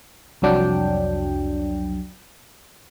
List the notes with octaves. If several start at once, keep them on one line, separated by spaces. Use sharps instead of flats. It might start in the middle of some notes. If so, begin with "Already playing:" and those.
C2 F2 F#3 D4 G5